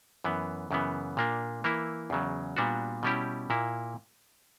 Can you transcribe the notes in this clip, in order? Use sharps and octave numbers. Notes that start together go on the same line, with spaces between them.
F#2 E3 B3
F#2 C#3 E3 B3
A#2 A#3 D4
E3 A#3 E4
E2 C#3 F#3
A#2 G3 B3 D4 F#4
B2 G3 C#4 E4 G4
A#2 A#3 E4